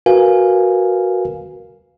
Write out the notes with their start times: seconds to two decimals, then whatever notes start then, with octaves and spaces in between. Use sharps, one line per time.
0.06 F#4 A#4 B4 F5 G#5